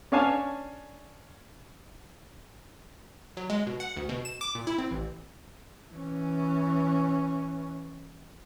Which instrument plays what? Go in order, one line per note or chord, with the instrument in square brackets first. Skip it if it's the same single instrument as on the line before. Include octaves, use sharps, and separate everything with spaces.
[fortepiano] C#4 D4 C#5 F5 G#5 A5
[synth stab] F#3
G#3
B2
F#5
D2
B2
E7
D6
A#2
E4
C4
A1
[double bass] E3 C#4